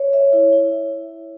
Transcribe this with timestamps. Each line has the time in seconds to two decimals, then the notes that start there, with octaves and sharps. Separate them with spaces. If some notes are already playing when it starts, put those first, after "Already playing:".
Already playing: C#5
0.13 E5
0.33 E4
0.53 E4